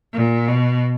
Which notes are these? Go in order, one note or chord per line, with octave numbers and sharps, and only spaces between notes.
A#2
B2